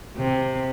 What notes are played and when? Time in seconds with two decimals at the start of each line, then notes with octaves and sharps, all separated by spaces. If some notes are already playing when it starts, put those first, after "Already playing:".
0.17 C3